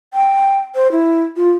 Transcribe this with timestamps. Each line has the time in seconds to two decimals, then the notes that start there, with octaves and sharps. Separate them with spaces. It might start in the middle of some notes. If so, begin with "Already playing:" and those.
0.14 G5
0.75 C5
0.92 E4
1.36 F4